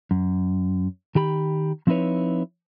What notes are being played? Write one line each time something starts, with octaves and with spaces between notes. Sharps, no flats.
F#2
D#3 G4 B5
F3 C4 D#4 E4 B4 C#5